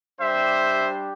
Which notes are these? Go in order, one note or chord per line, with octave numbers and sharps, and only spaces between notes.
G3 D4 G4 C5 E5